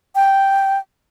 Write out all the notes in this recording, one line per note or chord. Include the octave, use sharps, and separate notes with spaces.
G5